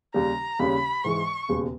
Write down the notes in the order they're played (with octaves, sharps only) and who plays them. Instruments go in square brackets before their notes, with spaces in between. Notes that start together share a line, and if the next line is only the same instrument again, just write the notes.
[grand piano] D#2 C#3 G3 [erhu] A#5
[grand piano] D#2 C#3 G3 C#4 [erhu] B5
[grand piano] G#2 E3 G#3 [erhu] C#6
[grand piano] E1 D#2 C#3 G#3